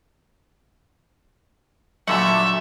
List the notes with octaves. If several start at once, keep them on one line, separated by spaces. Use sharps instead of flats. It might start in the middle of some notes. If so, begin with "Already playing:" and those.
A#2 D3 F#3 A3 E5 F#5